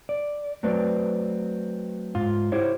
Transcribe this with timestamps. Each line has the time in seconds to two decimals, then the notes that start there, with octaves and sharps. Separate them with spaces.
0.09 D5
0.63 F#3 A3 C4 B4 D5
2.15 G#2 F4
2.52 E4 G4 C5 C#5